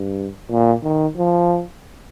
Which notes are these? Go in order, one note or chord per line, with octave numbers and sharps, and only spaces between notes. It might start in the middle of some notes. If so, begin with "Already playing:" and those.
Already playing: G2
A#2
D#3
F3